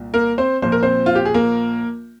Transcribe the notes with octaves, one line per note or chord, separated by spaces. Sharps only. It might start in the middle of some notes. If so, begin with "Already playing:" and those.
Already playing: C2 A#2
A#3 A#4
C4 C5
A#1 A#2 F3 C5
A#4
C4 C5
F4
G4
G#4
A#3 A#4